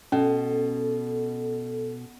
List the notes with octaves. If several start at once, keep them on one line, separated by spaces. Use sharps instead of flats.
B2 C#4 A4